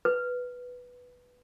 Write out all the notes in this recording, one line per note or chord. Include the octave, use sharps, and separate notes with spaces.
B4